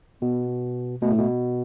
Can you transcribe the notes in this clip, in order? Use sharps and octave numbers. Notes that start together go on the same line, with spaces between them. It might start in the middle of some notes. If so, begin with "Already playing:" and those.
B2 B3
B2 A3
A2
B2